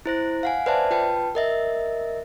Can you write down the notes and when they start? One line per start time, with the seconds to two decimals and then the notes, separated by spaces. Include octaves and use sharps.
0.06 E4 C5 A#6
0.43 F5 F#5 G#5
0.66 B4 C5 D5 E5 A5
0.91 F4 B4 G5 A5
1.35 A#4 D#5 E5